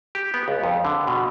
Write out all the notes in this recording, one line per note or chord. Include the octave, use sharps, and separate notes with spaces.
G4
B3
C#2
F2
D3
B2